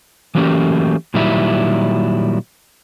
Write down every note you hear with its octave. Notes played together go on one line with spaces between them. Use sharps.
E3 F#3 A3 A#3 C#4 G4
A#2 D#3 F#3 G3 E4